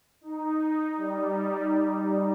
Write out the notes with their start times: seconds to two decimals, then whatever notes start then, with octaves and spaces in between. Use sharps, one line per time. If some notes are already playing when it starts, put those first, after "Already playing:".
0.21 D#4
0.97 G3